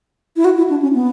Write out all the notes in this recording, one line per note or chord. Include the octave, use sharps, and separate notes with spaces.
E4
F#4
E4
D4
C#4
B3